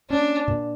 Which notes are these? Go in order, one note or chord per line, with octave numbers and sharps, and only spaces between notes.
A#3 C#4 D4
A#2